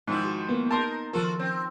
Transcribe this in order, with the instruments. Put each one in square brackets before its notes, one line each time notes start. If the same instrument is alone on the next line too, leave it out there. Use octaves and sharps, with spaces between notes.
[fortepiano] G#2 [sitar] D#3 F3 E4
[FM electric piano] F#4
A#3 B3
[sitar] D#4 A#4 [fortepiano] A5 C6
[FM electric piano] D#3 F3 A#4 [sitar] F4 F#4 A4
[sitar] C4